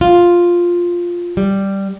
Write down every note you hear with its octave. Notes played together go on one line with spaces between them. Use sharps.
F4
G3